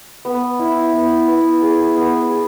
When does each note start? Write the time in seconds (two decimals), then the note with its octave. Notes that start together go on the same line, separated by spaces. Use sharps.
0.25 B3
0.59 E4
0.93 B3
1.28 B3
1.62 G#4
1.96 B3
2.30 G#4